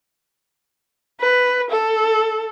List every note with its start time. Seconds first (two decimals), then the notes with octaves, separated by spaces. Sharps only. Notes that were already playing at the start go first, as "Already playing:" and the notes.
1.21 B4
1.70 A4